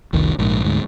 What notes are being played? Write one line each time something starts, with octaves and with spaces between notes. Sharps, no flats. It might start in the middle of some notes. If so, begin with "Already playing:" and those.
F1 C2 D#3
A#1 G#2
D2 G#2